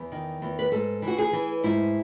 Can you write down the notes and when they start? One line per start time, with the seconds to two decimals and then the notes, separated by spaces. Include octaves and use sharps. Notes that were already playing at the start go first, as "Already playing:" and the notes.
Already playing: E2
0.12 D#3
0.42 E2
0.59 B4
0.72 G#2 A4
1.02 E3
1.08 F#4
1.18 G#4
1.33 E3
1.64 G#2 E4